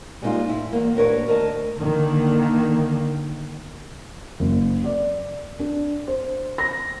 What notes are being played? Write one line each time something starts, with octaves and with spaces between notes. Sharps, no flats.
G3 G#3 A#3 B3 D#4 F4
A2 E4
E2 A#3
D#2 A2 D4 A#4 B4 C#5
D2 A#4 D#5 A5
D3 D#3 A#3
F#1
D5
D4
C5
A#6